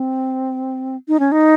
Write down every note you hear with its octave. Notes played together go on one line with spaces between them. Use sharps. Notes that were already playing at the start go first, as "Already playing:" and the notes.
Already playing: C4
D#4
C#4
D#4